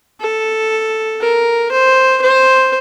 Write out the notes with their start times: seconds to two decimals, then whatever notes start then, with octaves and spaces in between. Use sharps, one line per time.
0.21 A4
1.21 A#4
1.71 C5
2.22 C5